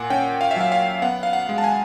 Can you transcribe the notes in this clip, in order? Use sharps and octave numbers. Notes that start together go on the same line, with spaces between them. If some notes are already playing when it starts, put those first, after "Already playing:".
Already playing: A#2 A#3 F#5 G#5
C#4 G5
F5
E5
F#3 F5
F5
B3 F#5
F5
F#5
G#3
A5
G#5